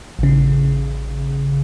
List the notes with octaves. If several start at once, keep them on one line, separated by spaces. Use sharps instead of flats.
A1 C#3